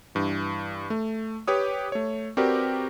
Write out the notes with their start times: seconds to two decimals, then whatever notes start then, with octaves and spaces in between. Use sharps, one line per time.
0.15 G2 E3
0.90 A3
1.47 G4 B4 C#5 D#6
1.92 A3 C#5
2.37 C4 F#4 G4 A#4 B4 D5